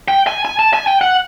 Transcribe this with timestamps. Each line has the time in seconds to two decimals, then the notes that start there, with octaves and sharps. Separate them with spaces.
0.08 G5
0.27 G#5
0.45 G#5
0.59 A5
0.74 G#5
0.87 G5
1.01 F#5